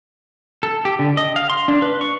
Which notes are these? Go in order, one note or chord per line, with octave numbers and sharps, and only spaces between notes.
A4
G4
D3
D#5
F5
C6
D4
B4
C#6